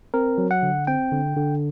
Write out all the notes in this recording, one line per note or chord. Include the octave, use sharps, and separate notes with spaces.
C4 A#4
F#3
F#5
D3
C4 G5
D3
D3